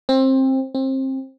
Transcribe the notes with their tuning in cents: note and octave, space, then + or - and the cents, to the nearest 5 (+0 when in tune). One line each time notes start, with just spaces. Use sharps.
C4 +20
C4 +25